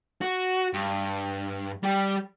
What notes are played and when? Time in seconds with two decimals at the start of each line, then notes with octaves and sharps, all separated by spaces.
0.21 F#4
0.73 G2
1.83 G3 G4